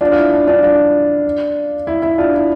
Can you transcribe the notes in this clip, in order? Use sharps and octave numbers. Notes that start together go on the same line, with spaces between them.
D4 F4
F4
E4
D4
D4 F4
D4 F4
E4
E4
D4 F4
E4